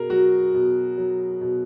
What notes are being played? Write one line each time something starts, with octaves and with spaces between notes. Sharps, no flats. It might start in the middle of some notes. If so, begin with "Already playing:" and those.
Already playing: B2 G#4 A#4
F#3 F#4
B2
F#3
B2